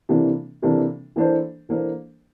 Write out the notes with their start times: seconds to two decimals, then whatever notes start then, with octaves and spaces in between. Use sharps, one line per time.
0.09 C3 E3 A#3 D4 A4
0.62 C3 E3 A#3 D4 A4
1.16 E3 A#3 D4 A4 C5
1.69 E3 A#3 D4 A4 C5